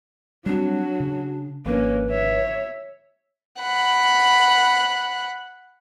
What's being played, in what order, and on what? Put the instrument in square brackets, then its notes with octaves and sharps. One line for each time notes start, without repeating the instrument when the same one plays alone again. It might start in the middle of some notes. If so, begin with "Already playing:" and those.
[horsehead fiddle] F#3 F#4 [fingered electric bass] G3 C4 [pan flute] D4
[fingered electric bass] C#3
[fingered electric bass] G#1 F3 D4 [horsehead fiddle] A#3 C#4 [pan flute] B4
[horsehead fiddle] C#5 E5
[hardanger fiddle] F#5 B5